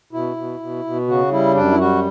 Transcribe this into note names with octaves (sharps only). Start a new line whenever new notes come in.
B2 E4
B2
B2
B2
C#3 F#4
G3 E4
F#2 D4
E4
G3 F#4